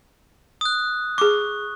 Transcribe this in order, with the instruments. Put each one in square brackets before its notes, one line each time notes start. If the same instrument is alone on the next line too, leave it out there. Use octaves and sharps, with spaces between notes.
[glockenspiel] D#6 F#6
[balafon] G#4 D6 [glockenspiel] C#6